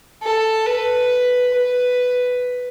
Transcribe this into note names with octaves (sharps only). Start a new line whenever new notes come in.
A4
B4
B4